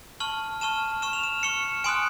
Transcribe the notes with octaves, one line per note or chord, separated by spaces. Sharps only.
A5 C#6 F6 F#7
A5 C#6 F6 E7
C#6 F6 E7
F7
E7
C#6 F6 C#7
G#5 C6 D#6 F#6 D7